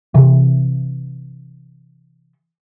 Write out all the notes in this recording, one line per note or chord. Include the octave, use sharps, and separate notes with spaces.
C3 E3